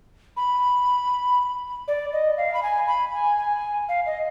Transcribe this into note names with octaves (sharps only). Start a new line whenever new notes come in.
B5
D5
D#5
F5
B5
G#5
B5
G#5
G#5
F5
D#5